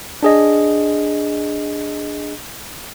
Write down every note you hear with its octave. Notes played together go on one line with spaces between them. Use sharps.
D4 G#4 D#5